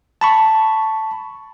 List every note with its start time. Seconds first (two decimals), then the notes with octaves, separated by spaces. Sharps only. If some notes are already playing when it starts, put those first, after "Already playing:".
0.21 A5 B5 C#6